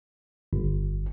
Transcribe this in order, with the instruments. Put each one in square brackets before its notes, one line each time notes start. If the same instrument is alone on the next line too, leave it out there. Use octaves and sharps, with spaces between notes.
[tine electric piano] G1